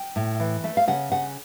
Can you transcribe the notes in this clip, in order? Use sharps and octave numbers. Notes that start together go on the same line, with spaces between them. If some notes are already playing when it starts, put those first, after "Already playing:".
Already playing: G5
A2
E3
A3
F5
C#3 F#5
C#3 F#5